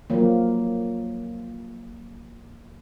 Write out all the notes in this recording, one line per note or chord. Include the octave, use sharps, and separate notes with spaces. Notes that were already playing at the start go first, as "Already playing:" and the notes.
F3 F#3 A#3